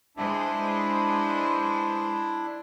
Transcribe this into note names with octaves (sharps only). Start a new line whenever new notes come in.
G#3 D4 E4 B4 C5